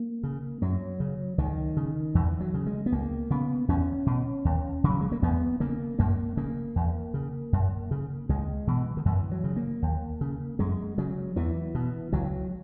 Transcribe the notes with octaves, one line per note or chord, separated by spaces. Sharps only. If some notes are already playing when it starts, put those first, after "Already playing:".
Already playing: A#3
C#3
F#2 F#3
C#3
C#2 D#3
C#3
E2 E3
F#3
C#3
G#3
B3
C#2 A#3
C#3 B3
E2 C#4
B2
D#2
C#3
F#3
G#3
A#3
E2 B3
C#3 A#3
F#2 A#3
C#3 A#3
E2
C#3
F#2
C#3
C#2 G#3
B2 E3
D#3
F#2 E3
F#3
C#3
A#3
D#2
C#3
F#2 G#3
C#3 F#3
E2 E3
B2
C#2 F#3